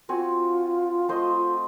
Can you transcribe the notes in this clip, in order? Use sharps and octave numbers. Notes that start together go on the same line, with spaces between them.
C4 F4 F#4 G#5
A3 C5 D#5